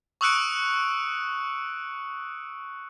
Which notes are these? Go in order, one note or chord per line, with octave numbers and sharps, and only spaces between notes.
C#6 D#6 E6 F#6 C#7 D7